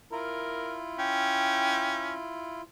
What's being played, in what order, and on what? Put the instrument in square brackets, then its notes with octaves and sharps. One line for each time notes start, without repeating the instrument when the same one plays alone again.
[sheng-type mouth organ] E4 F4 [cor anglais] A#4
[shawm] C#4 [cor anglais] G5